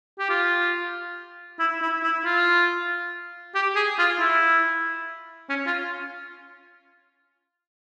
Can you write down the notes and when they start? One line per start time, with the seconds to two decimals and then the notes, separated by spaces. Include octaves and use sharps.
0.19 G4
0.30 F4
1.59 E4
1.82 E4
2.03 E4
2.25 F4
3.55 G4
3.76 G#4
3.99 F4
4.20 E4
5.49 C#4
5.67 F4